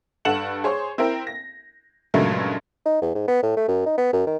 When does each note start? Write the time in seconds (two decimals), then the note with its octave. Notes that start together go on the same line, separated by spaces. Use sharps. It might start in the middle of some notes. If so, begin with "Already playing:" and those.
0.25 G2 A4 F#5 C#7 E7 F#7
0.64 G#4 C5 C#5
0.98 C4 E4 A#4 G5
1.27 A#6
2.14 G2 A#2 C#3 F#3 G#3 A3
2.86 D#4
3.02 E2
3.15 G#2
3.28 B3
3.43 A2
3.57 A3
3.68 F#2
3.86 D#4
3.98 B3
4.13 F#2
4.27 D#3